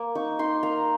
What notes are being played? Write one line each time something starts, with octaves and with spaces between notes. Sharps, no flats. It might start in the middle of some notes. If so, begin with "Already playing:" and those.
Already playing: A#3
D#4 C#6
D#4 C6
A#3 A#5